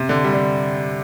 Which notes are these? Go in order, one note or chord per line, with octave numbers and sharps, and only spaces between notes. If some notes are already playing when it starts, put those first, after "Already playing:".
Already playing: C3
D3
G3
D3